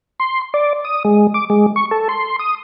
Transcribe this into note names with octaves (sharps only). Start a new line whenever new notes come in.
C6
D5
D#6
G#3
D6
G#3
C#6
A4
C6
D#6